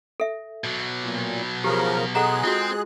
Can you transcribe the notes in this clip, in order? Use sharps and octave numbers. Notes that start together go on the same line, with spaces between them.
A4 E5
B2 F#3
A#2
C#3 F3 G4 A#4
G#3 G#4 A4 F#5 A#5 F#6
C4 F4 F#4